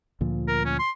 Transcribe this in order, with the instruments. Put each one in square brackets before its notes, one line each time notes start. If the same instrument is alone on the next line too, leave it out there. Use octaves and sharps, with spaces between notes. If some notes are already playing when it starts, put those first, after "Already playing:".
[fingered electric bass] D2 A#2 F3
[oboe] A#4
C#4
C6